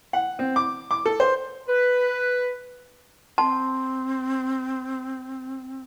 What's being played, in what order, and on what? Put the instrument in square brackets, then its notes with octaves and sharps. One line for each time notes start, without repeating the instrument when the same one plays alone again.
[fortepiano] F#5
C4
D6
D6
A4
C5
[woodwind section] B4
[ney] C4 [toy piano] A5 [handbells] C6